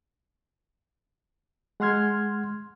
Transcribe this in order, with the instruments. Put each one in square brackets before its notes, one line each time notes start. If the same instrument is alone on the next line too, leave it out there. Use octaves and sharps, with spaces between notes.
[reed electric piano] G#3 F#5 C6 F6 G#6